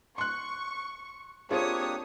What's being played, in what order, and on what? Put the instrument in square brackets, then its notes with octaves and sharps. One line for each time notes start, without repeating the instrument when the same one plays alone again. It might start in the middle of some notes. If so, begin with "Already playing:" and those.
[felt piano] C6 F#6 [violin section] C#6
[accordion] A#3 D4 G4 [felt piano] C4 F4 G#4 [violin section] C#5 D#6